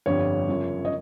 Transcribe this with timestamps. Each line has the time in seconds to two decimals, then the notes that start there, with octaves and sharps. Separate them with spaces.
0.06 G1 F2 D3 G3 C#5
0.49 F#2 C#3 F3
0.85 D#5